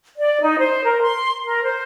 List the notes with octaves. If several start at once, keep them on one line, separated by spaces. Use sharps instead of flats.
D5
D#4
C5
A#4
C6
A#4
C5